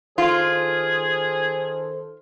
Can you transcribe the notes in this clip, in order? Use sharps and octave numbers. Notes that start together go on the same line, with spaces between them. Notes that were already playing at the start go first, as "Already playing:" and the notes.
D#3 F4 G#4 A4 C5